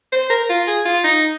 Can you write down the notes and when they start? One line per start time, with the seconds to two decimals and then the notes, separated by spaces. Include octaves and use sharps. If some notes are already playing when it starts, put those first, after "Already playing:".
0.12 C5
0.30 A#4
0.50 F4
0.67 G#4
0.85 F4
1.04 D#4